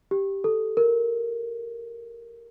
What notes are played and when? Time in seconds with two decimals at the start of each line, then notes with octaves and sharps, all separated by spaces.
0.11 G4
0.44 A4
0.77 A#4